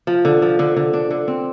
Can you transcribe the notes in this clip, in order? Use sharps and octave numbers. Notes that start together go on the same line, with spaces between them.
F3
D3
F3
D3
D3
D4
D3
C4